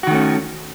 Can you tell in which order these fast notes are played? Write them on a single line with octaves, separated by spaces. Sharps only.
F#4 D#3 A3 C#4